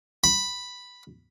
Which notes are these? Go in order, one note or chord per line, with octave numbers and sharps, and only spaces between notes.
B5